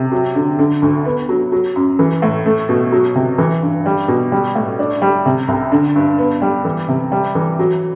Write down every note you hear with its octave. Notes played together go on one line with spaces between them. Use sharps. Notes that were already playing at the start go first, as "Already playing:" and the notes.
Already playing: C3
F#3
D3
D3
D2
B3
F#3
F#3
F#2
E3
A2
A3
B2
F#3
C3
E3
G2
G3
B2
G3
A2
D4
G3
C3
C2
D3
G2
B3
G3
E3
C3
G3
E3
F#3